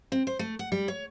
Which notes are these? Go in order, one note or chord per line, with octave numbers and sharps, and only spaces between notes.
C4
C5
A3
F#5
G3
C#5